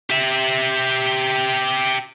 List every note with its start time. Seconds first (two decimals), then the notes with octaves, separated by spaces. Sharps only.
0.10 G4 E5